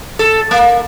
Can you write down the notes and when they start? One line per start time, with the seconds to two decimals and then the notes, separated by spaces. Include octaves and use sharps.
0.19 A4
0.51 A#3